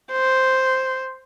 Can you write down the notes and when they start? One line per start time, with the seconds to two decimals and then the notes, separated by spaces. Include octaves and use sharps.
0.12 C5